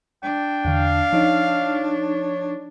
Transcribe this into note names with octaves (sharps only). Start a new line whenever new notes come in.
D4 G5
E2 D3 F5
F3 D#4 C#5